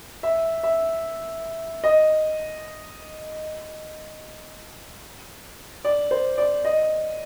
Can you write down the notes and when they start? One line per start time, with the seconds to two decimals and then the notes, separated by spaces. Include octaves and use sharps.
0.23 E5
0.63 E5
1.84 D#5
5.85 D5
6.11 C5
6.38 D5
6.65 D#5